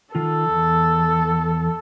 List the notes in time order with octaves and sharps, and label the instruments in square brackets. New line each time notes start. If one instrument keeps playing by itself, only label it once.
[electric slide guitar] D#3 F4 [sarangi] A4
[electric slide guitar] E2